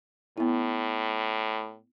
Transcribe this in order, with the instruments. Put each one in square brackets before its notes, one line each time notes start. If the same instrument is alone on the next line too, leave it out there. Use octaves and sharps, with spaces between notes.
[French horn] A2 [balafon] B3 E4